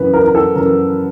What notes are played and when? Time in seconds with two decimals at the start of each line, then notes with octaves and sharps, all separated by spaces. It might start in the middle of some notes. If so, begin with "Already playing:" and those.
Already playing: F#2 C#3 E3 B4
0.13 A#4
0.24 A#4
0.35 A4
0.55 F#2 C#3 E3 A#4